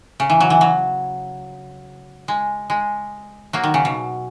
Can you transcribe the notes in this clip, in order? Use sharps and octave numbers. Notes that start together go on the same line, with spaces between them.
C#3
E3
F#3
E3
F#3
G#3
G#3
F#3 A#3
D#3
C#3
B2